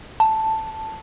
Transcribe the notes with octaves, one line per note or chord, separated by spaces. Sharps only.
A5